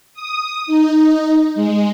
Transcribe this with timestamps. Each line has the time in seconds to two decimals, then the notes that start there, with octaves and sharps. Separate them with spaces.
0.14 D#6
0.67 D#4
1.55 G#3